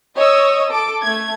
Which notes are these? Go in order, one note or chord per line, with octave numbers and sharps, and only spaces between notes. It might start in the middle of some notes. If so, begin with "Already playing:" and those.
C#5 D#5 C#6 D#6 E6
A4 D6
A3 G#6